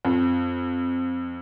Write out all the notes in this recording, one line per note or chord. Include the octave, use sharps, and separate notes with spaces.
F2